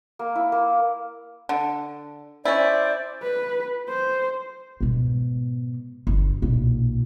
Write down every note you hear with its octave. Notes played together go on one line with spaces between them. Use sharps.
A#3
E4
A#3
D3
C#4 E4 C5 D5
B4
C5
G#2 B2
G1
B1 A#2